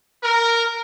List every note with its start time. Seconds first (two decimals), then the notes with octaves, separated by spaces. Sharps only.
0.23 A#4